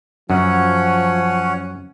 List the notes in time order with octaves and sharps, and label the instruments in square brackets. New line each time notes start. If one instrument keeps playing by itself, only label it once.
[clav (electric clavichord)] F#2 [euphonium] F3 [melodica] C#4 C#5 F#5